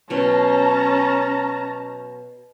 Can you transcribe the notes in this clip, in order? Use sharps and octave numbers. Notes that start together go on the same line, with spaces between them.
B2 F#3 C#4 A5 A#5